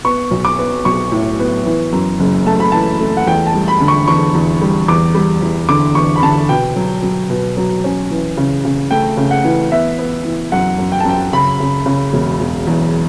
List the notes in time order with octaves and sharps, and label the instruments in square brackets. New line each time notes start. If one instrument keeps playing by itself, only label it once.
[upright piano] B3 C#6
B1
D6
B3
B1 C#6
A2
B3
E3
F#2
F#1
A3 A5
B5
E3 A5
A3
F#5
E2 G5
A5
G3
B5
D3
C#6
E2 C#6
E2
G3
E2 D6
G3
E2
D3 D6
E2 C#6
B5
D3 A5
B2 G5
F#3
F#3
B2
F#3
C#4
E3
C#3
C#3
A3 G5
C#3
F#5
E3
B3 E5
B3
E3
F#2 F#5
F#2
G5
A5
F#2 G5
C#3 B5
C#3
C#3
E1
E1
E2